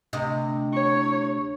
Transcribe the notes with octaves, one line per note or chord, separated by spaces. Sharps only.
D2 C3 D#5
C#5